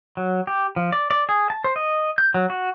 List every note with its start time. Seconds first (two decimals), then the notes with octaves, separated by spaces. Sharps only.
0.17 F#3
0.47 G4
0.76 F3
0.92 D5
1.11 D5
1.29 G#4
1.50 A5
1.64 C5
1.76 D#5
2.18 G6
2.34 F#3
2.50 F#4